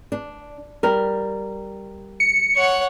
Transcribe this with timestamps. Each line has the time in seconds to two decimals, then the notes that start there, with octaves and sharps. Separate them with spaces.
0.12 D4
0.83 G3 A#4
2.20 C#7
2.56 C#5 F#5